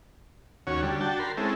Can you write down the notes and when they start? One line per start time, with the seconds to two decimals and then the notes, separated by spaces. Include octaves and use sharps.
0.67 D#2 C#4 F#4 C#5
0.82 D3 G3
1.00 D4 F#4 G5 A5
1.19 A#4 B5 C6
1.37 G#3 C4 C#4 E4 A4